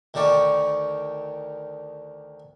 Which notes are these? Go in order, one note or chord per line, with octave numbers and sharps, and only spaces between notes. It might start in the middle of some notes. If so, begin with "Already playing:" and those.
D2 D3 D#3 D5 C#6